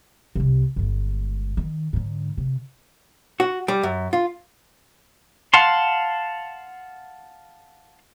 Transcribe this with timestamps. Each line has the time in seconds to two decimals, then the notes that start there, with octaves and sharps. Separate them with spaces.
0.35 C2 C3
0.76 G1 G#3
1.57 D#3
1.93 G#2 D3
2.37 C3
3.40 F#4
3.68 G3
3.83 F#2
4.13 F4
5.54 F5 F#5 A5 C6